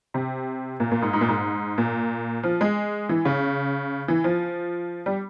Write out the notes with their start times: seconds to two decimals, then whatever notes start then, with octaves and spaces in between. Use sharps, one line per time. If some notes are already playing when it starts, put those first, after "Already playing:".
0.14 C3
0.80 A#2
0.91 A#2
1.02 G#2
1.13 G#2
1.21 A#2
1.28 G#2
1.78 A#2
2.43 F3
2.61 G#3
3.09 E3
3.25 C#3
4.08 E3
4.24 F3
5.06 G3